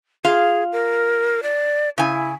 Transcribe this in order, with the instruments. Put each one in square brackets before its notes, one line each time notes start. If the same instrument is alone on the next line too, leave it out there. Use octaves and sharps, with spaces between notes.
[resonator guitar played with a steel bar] F4 F5 [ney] G#4
[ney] A#4
D5
[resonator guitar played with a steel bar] C#3 G#5 [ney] E4